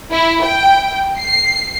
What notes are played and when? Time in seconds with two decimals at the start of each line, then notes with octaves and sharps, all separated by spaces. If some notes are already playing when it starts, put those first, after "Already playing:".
0.12 E4
0.45 G5
1.19 C7